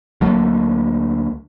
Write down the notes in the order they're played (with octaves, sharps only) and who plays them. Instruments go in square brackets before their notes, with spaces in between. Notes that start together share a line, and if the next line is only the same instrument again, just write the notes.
[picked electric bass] D2 F#3 A3 A#3